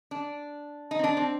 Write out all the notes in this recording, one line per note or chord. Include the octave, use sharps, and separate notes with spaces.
D4
D#4
C4
D4
C4